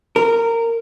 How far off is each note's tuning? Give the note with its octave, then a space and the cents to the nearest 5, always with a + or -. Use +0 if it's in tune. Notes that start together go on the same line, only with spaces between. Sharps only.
A#4 -15